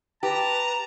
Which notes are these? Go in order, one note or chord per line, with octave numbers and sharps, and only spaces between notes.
G4 B4 A5 A#5